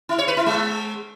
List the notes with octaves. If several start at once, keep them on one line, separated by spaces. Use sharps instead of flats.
E4
C#5
B4
E4
G#3